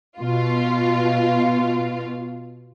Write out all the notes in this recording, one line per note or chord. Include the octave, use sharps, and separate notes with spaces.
B2 F4